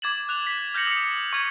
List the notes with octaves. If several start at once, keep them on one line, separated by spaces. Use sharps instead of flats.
D6 G#6 A6 E7 F#7
F#6 F7
B6
F6 G6 A#6 C#7 F#7
D#6 C#7
C#6 D6 F6 G#6 D#7